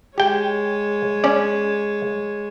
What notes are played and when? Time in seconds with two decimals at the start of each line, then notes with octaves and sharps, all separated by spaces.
0.18 G#3 G4 C#5 G5
1.24 C#4 D5